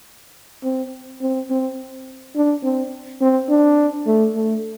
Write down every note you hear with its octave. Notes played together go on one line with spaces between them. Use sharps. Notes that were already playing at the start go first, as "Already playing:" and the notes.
C4
C4
C4
D4
C4
C4
D4
A3
A3